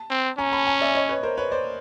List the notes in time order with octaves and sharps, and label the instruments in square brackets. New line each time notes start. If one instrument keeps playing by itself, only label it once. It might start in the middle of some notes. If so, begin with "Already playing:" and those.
Already playing: [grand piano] A5
[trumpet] C4
[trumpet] C#4 [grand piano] G#5 A#5
[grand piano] A5 B5
G#5 A#5
D5 E5
C#5 D#5
B4 C#5
A#4 C5
B4 C#5
C5 D5